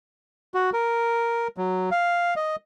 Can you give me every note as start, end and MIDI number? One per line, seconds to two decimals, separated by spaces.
0.54 0.70 66
0.73 1.48 70
1.57 1.90 54
1.91 2.34 77
2.36 2.56 75